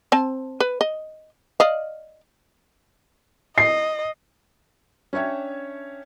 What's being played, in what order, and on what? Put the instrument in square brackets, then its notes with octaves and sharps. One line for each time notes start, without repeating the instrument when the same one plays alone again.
[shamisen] C4 A5
B4
D#5
D5 D#5 F5
[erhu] D#5 [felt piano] C7
[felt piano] C#4 D4 C#5 E5 G5